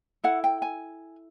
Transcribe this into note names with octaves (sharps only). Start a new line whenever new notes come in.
E4 A4 F#5
G5
G#5